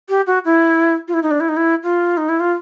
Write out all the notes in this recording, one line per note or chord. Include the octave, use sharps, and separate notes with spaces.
G4
F#4
E4
F4
E4
D#4
D4
E4
D#4
E4
F4
D#4
E4
F4